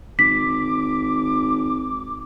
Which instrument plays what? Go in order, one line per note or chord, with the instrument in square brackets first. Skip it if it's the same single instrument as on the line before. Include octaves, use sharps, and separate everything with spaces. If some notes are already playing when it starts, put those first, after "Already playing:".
[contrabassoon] G#1 [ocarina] D6 [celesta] B6